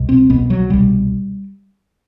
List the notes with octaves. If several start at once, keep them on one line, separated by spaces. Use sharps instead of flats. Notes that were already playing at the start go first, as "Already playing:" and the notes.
Already playing: C2 B2
C4
C2 B2 B3
F#3
C2 B2 G3